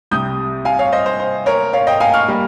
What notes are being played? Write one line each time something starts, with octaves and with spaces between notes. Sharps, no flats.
C2 C3 G3 D#6 G6
F5 G#5
C#5 F5
C5 D#5
C5
C5
A#4 C#5
C#5 F5
D#5 G5
F5 G#5
C#6 F6
G3 A#3